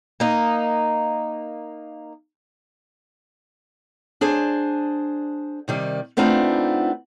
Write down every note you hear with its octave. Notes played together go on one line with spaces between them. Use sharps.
A#3 D#4
D4 G#4 C5 G#5
C3 D#3 G3
A3 B3 C4 D4 D#4 F4